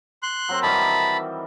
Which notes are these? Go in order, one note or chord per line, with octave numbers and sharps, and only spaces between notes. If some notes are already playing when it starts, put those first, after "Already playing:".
C6 F#6
F#3 C4 A#4
D#3 E3 G3 A5 B5